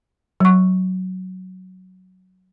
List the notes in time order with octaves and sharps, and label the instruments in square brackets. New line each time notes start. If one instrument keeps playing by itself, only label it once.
[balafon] F#3 C#6